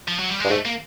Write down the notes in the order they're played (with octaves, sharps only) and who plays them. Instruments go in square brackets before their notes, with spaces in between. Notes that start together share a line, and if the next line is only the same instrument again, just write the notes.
[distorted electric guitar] F3
F#3
G3
[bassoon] G2 [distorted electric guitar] G#3
[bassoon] G#2 [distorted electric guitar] A3
[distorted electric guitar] A#3